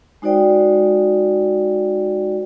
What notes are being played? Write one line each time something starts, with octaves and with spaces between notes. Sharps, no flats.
G#3 D#4 F#4 C5 D5 G5